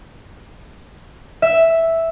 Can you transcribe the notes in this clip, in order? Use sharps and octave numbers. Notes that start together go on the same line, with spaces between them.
E5